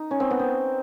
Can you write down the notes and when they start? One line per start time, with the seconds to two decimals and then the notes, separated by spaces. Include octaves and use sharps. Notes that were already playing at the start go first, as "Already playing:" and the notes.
Already playing: D#4
0.11 C#4
0.20 C4
0.31 B3
0.39 C4